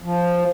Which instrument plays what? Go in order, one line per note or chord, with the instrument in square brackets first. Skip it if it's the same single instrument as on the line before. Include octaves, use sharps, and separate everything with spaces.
[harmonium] F3